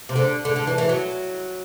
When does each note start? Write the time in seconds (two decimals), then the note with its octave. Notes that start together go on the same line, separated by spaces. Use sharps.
0.09 C3
0.16 D3
0.45 D3
0.56 D3
0.67 E3
0.78 E3
0.89 F#3